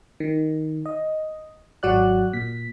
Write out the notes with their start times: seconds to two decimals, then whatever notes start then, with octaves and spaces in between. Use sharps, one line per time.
0.20 D#3
0.86 D#5
1.83 G#1 F#3 F#4 D5 F#6
2.33 A#2 B6